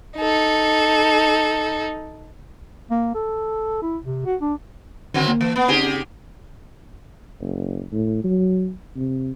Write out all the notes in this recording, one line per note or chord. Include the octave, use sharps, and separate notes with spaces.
D#4 A4
A#3
A4
E4
C3
F#4
D4
D3 D#3 F#3 C4
A#3
E3
B3
C#3 C4 D#4 G4 G#4
F#1
A2
F#3
C3